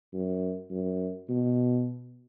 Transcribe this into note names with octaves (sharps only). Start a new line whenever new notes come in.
F#2
F#2
B2